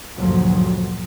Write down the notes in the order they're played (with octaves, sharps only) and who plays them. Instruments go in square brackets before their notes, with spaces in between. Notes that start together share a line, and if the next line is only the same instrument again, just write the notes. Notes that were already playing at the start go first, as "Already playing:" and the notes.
[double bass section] D2 G2 A#2 F3 F#3